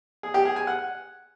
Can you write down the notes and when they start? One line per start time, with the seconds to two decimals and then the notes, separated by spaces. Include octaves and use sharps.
0.23 G#4
0.34 G4
0.45 G#4
0.56 G#5
0.67 F#5